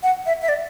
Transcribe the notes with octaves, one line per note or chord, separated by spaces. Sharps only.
F#5
E5
E5
D5